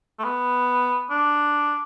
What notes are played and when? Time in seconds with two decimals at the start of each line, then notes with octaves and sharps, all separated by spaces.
0.19 A3
0.24 B3
1.10 D4